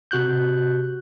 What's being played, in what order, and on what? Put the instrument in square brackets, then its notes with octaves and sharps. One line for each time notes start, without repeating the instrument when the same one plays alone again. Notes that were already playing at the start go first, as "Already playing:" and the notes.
[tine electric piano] C3 F#4 F#6 G6